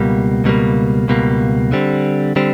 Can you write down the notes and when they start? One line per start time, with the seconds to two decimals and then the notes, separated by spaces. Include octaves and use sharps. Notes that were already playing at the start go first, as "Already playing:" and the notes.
Already playing: C#2 B2 G3 A#3
0.44 C#2 B2 G3 A#3
1.08 C#2 B2 G3 A#3
1.72 D3 G3 C4
2.36 D3 G3 C4